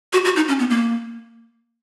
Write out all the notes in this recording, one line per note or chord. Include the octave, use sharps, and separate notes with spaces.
F#4
F#4
D#4
C#4
B3
A#3